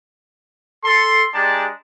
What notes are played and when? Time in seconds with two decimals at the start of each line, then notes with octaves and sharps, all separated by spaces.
0.84 A4 C6
1.34 G#3 D4 G4 D5 A5 A#5